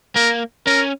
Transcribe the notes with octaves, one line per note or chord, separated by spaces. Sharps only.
A#3 A#4
C#4 A#4